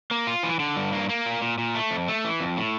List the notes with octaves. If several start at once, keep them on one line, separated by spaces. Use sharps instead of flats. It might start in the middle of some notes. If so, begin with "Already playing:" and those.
A#3
F4
E3
D3
G2
A#3
A#3
A#2
A#2
A#2
A3
F2
A3
E3
F2
A2